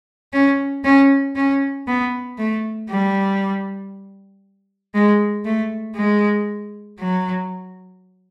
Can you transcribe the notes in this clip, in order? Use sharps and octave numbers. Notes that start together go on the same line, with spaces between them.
C#4
C#4
C#4
B3
A3
G3
G#3
A3
G#3
F#3